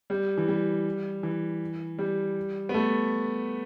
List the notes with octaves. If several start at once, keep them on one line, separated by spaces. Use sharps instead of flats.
G3
E3
G3
E3
G3
B3
A3